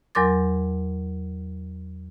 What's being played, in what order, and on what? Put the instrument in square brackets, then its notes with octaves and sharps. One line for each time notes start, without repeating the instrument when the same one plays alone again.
[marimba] E2 F#3 A#4 C6 D6 A6